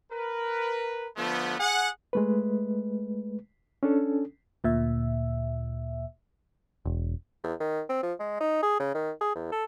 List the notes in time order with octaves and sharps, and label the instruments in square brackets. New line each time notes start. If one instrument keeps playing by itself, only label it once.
[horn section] A#4 B4
D3 F3 A3 B3
G#4 F#5
[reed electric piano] G#3 A3 B4
C#4 D4 A4
[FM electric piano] D2 A#2 E5
[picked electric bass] E1
[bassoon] E2
D#3
C4
F3
G#3
D#4
G#4
C#3
D#3
G#4
E2
A4